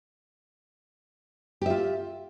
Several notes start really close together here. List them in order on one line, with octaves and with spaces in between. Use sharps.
G4 E5 F4